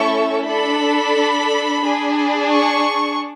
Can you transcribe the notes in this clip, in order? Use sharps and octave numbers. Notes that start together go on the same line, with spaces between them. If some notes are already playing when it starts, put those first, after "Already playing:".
Already playing: A3 C#4 E4 A4 C#6
D4 A4 B5
D4 G#4
C#6